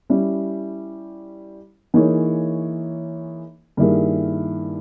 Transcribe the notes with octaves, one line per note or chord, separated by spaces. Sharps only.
G3 C#4 E4
E3 A#3 D#4 G#4 C#5
G2 D#3 A#3 E4 G#4